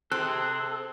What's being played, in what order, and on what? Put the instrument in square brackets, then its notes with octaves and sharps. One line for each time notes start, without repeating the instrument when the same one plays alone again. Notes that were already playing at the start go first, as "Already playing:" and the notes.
[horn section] C3 G#4 [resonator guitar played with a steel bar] C4 [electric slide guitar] A4 [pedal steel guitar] F#6